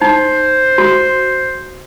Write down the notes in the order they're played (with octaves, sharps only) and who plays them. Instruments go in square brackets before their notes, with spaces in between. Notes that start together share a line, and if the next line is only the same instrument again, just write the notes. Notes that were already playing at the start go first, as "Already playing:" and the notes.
[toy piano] D#4 [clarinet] C5
[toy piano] F#4